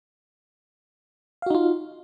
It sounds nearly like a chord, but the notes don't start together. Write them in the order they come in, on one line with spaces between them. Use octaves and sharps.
F5 F#4 D#4 F4